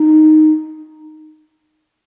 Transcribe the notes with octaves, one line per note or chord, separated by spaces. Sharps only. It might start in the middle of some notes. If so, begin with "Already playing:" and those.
Already playing: D#4